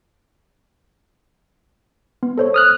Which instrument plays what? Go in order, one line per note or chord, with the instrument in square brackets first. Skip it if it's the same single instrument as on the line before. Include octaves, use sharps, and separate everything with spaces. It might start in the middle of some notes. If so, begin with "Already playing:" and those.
[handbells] B3
A4 C5 C#5
[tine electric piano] D#6 F6 F#6